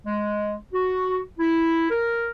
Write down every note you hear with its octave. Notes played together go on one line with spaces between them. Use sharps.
G#3
F#4
E4
A#4